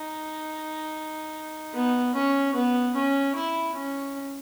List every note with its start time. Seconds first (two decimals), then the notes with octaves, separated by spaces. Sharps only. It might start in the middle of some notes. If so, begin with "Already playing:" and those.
Already playing: D#4
1.73 B3
2.14 C#4
2.54 B3
2.95 C#4
3.35 E4
3.75 C#4